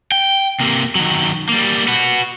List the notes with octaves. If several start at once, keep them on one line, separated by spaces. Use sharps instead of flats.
G5
C3 A#3
D#3 F#3
G3 A#3
F#4 B4